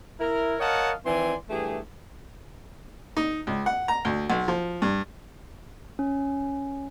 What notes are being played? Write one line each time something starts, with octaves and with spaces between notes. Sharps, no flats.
E4 A#4
A#4 C#5 D#5 F5 F#5 A5
D#3 E3 C4 D5 G#5 C6
G2 E3 A3 G4 G#4
D#4
C#2
F#5
A#5
D2
B1
F3
G2
C#4